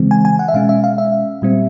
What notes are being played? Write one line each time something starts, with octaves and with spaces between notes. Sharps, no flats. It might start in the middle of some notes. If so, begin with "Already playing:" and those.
Already playing: C#3 E3 G#3 C4
G#5
G#5
F#5
E5
B2 G#3 C#4 F5
E5
F5
E5
A#2 G3 C4